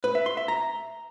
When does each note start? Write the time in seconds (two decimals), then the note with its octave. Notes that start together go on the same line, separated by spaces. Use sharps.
0.04 B4
0.15 E5
0.26 C6
0.37 E5
0.48 A#5